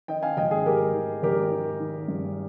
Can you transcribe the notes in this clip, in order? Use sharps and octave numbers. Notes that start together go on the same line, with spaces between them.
D#3 D#5 G5
F5 G#5
G#1 D#5 G5
G#4
G#1 G4 A#4
D#3
G#1 G4 A#4
D#3
D#3
G2